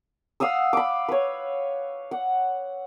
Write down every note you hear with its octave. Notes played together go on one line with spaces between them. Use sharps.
F5 F#5 D#6 E6
B5 D6
B4 C#5
F#5